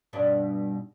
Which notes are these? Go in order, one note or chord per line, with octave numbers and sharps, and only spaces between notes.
G2 B2 D4